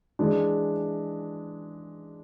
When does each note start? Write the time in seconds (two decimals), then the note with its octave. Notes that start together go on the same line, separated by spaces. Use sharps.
0.19 E3 G#3 D4